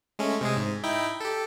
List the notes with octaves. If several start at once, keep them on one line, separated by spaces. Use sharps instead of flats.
G#3 A3 C#4
C3 G#3 G#4
G#2
D#4 E4 G5
G4 A4